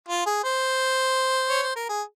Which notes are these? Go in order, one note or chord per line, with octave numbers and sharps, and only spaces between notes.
F4
G#4
C5
C#5
C5
A#4
G#4